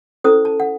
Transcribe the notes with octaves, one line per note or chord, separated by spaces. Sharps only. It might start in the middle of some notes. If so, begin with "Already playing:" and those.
C#4 E4 A4 C5 D#6
A5
F#5